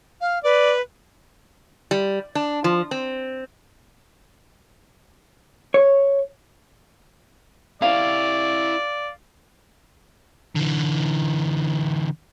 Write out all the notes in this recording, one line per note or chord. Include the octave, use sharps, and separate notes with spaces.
F5
B4 D5
G3
D4
F3
C4
C#5
E4 G4 D5 F5
D3 E3